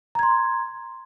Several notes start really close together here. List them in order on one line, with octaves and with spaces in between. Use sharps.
A#5 G#6 C6